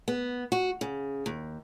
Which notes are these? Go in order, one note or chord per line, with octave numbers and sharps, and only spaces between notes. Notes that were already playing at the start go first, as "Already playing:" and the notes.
B3
F#4
C#3
D#2